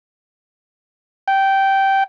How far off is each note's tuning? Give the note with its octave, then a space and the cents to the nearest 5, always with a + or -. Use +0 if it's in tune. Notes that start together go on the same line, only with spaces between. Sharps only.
G5 -15